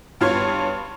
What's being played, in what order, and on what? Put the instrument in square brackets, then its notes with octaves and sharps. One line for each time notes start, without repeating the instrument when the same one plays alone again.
[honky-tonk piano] G2 B3 F4 C#5 C6 G#6